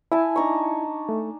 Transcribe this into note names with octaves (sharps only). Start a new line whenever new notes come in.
E4 G#5 A5
D4 D#4 C#6
A3